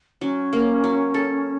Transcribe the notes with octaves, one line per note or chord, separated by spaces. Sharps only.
F#3 C#4
A#3
F#3
A4